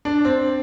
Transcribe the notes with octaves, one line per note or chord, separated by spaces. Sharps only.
D4
C4